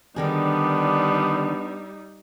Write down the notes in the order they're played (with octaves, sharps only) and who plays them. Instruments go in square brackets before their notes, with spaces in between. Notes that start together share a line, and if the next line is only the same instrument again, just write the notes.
[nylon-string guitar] D3 D#3 G#4 [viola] G3 D#4 [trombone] B3 [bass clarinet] D4